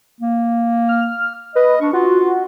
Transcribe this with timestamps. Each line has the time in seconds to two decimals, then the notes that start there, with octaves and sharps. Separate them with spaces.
0.21 A#3
0.88 F6
1.56 B4 D#5
1.81 D4 C#6
1.93 F4 F#4